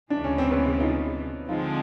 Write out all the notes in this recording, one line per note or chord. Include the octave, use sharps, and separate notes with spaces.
D2 C#3 E3 G#3 D4
C#4
C4
B3 C#4
D#4 F4
D3 F3 G#3 C4 D#4 F4